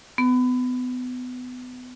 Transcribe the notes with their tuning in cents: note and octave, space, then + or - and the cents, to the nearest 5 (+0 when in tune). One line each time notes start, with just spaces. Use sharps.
B3 +25